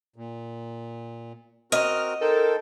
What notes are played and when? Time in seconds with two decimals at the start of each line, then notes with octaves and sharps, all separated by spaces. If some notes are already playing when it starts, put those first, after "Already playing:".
0.16 A#2
1.72 C4 F#4 A#4 D#5 F6
2.21 D#4 A4 A#4 C5 G5